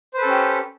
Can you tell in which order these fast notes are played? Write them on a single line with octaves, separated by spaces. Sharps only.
C5 B4 A4 C#4 G4